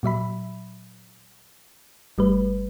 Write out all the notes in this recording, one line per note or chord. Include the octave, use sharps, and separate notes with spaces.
A#2 F#3 E5 B5
G1 G3 A3 B4